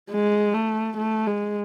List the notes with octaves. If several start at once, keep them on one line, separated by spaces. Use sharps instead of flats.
G#3
A3
A3
G#3